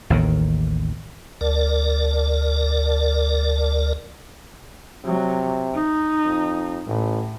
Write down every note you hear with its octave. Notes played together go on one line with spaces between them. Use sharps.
A1 D#2 D#3
D2 A#4 D5
C3 F#3
D#4
F2
A1 A2